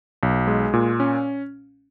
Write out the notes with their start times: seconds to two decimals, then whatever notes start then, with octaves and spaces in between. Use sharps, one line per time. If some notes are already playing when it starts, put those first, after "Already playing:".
0.23 B1
0.48 G#3
0.73 A#2
1.00 C#4